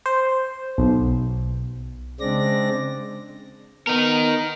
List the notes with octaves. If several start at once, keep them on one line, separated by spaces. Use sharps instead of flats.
C5
B1
C#3 G#3 C4 D4 D5 A#6
B3 D#4 A#4